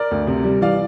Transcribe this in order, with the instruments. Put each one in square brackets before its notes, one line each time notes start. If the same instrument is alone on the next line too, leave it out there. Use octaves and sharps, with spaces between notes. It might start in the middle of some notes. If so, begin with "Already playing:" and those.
Already playing: [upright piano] A#4 D5
D2
C3
G3
E3 D5 F5